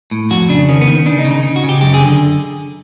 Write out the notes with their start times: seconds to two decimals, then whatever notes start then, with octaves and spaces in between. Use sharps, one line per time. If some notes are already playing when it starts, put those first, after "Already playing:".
0.11 A2
0.30 F2 F#4
0.49 C#3 D4
0.68 D#3 C#4
0.81 B3
0.87 D#3
1.06 C#3 D4
1.19 D#4
1.25 C#3
1.31 D#4
1.43 C#3
1.56 F#4
1.63 C#3
1.69 G4
1.81 F#2 G4
1.94 G#4
2.01 D3